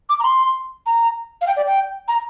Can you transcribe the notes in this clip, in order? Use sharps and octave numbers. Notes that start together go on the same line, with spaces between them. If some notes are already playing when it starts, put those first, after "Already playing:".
D6
A#5
C6
A#5
F5
G5
D5
G5
A#5